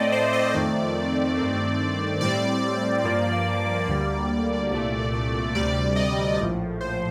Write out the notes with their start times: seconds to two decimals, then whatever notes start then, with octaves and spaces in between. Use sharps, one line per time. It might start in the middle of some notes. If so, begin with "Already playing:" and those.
Already playing: A2 A3 C4 D5 D#5
0.12 C5
0.33 D#5
0.54 F2 D#3 A3 C4 D5
1.37 G2 D#3 A3 C4
2.21 A2 G3 C4 D5
3.04 G2 F3 A#3
3.87 D2 D3 G3 A#3 D5
4.71 C2 A#2 A3
5.55 D2 C3 G3 D5
5.96 D#5
6.38 A#1 A2 F3
6.81 C5